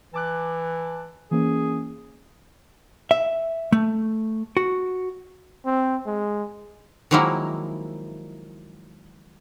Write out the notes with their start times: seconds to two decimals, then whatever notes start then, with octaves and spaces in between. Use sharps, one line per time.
0.14 E3 A5 D6 F#6
1.31 E3 A#3 C#4 G#4
3.11 E5
3.72 A3
4.57 F#4
5.66 C4
6.07 G#3
7.11 D#3 F3 F#3 G#3 A#3 E4